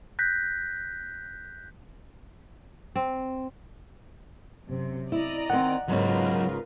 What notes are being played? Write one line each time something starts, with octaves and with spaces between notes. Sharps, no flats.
F#6 G6 A#6 B6
C4
F#2 C3
E4 D5 D#5 A#5
D#3 C4 F#5
G#2 C#3 F#3 F4 A#4 B4 D#5